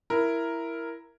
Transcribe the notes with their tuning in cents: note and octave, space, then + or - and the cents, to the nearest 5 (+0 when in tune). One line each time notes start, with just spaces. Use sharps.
E4 +10 A#4 +0